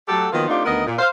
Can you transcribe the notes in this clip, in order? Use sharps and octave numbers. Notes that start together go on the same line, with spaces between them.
F#3 A3 F#4 G4 A4
D#3 F3 F#3 A#3 B3 F4
A3 C4 D4 D#4 F4 G4
D2 D#3 B3 A#4 D#5
A#2
C5 F5